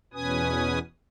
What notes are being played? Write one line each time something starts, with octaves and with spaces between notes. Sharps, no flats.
E2 B2 C#4 B4 G#5 D#6